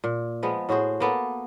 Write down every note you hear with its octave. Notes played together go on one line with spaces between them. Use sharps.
A#2
F3 G#3 B3
A2 F#4 G#4 C5
A#3 B3 A4